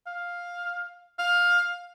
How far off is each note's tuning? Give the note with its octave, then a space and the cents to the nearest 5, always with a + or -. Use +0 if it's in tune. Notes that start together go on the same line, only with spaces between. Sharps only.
F5 +5
F5 +15